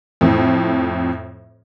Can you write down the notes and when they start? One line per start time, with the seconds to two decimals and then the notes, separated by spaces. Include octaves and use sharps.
0.21 F2 A2